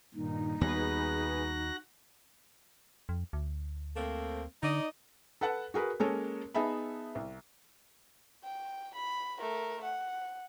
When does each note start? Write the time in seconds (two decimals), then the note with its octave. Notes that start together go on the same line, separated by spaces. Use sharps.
0.15 G2 A#2 D#3 D#4
0.61 D#2 G3 B3 F#4 G#4 B4 F#6 A#6
3.09 F2
3.33 D2
3.97 A3 A#3 C4
4.63 D3 D#4 D5 D#5
5.41 A4 B4 F#5 A5 F#6
5.74 F#4 G#4 A#4 B4
6.00 G#3 A#3 C#4 A4 A#4 C#5
6.55 B3 D#4 G#4 E5 A5 B5
7.15 C2
8.44 G5
8.96 B5
9.41 A3 A#4
9.85 F#5